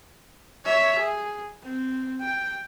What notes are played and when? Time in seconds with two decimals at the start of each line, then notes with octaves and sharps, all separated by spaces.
0.65 C#5 E5
0.99 G#4
1.63 C4
2.21 G5